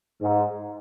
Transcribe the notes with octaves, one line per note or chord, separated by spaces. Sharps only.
G#2